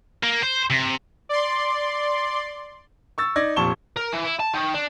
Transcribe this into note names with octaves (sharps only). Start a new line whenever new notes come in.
A#3
C5
C3
D5 C6
C#6 E6 A6
D#4 D5 G#6 A#6
F1 A#2 A5 C#6 E7 G7
A#4
E3
E4
A5
D#3
D4